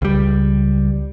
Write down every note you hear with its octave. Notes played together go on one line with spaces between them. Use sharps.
C#2 G3